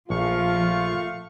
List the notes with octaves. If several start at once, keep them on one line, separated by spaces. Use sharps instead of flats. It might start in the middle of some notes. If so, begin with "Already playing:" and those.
A#1 F3 A3 F4 F5 C#6